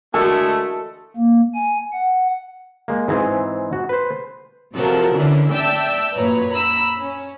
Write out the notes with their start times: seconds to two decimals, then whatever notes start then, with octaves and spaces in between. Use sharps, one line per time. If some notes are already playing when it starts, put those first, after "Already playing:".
0.14 D3 G#3 A3 F#4 A4 A#4
1.17 A#3
1.54 G#5
1.93 F#5
2.88 G#3 A#3
3.08 G#2 E3 C4 G#4
3.73 F#4
3.89 B4 C5
4.74 C3 F3 F#3 A4 A#4
5.15 D3 E3 C#4 D4
5.51 D5 E5 G5 A5 E6
6.16 F#2 A#2 B4 C#5 A#5
6.51 A#5 B5 E6
6.99 C#4